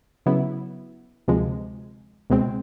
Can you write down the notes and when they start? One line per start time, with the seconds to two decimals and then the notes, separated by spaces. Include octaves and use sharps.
0.26 C#3 F#3 B3 E4
1.28 D2 C3 F3 G#3
2.30 C#2 B2 G#3 C4